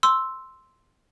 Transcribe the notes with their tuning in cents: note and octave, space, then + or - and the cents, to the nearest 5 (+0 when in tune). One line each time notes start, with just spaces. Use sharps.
C6 +0 E6 +0